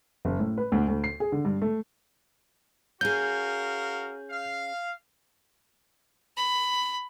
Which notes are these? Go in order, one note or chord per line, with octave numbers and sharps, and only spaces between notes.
F#1
A2
B4
D2
D2
C7
G#4
D3
G2
A3
C#4 F#4 G#4 A#4 F5 G6
F5
B5